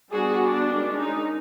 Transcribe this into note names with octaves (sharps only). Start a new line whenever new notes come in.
G3 B3 D4 F#4 G#4
D4
D#3 G#3 C#4
D#4